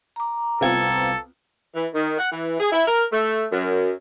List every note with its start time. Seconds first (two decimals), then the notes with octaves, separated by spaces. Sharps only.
0.16 A#5 D6
0.61 C2 B3 C4 F4 A4 G#6
1.75 E3
1.94 D#3
2.18 F#5
2.32 E3
2.59 G#4
2.72 E4
2.87 A#4
3.12 A3
3.52 F#2